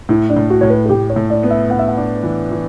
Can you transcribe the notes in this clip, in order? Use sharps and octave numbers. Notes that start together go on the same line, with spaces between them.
A2 E4
D4
A2
F#4
A2 C#5
B4
A4
A2 G4
C#5
A2
D5
B3
E5
B3 F#5
E5
F#5
D4
E3
E3